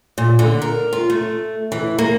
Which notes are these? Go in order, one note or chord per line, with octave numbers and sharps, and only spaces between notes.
A#2
D3
A#4
F4
A3
E3
A#3